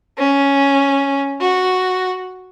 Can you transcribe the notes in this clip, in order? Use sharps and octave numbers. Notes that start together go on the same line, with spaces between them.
C#4
F#4